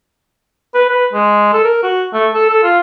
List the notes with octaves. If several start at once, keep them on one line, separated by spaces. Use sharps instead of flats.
B4
B4
G#3
A4
A#4
F#4
A3
A4
A4
F4